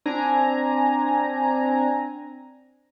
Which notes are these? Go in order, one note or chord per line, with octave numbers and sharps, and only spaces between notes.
C4 D4 G#5 A#5